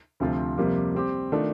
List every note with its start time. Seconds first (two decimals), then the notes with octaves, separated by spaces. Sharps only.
0.20 D2 C3 F3 C4 F4
0.57 F2 C3 G3 A#3
0.95 G3 C4 G4
1.32 D#3 A3 D4 F4